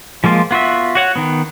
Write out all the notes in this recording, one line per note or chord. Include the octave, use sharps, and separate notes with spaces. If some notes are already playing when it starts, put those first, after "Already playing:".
F3 G#3 A#3 F4
B3 F4 F#4 E5
F#4 C#5 F#5
D#3 B3